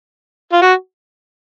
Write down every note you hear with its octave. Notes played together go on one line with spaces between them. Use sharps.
F4
F#4